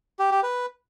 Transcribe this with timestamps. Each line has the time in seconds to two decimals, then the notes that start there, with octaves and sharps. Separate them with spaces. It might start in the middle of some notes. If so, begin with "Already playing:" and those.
0.19 G4
0.31 G4
0.43 B4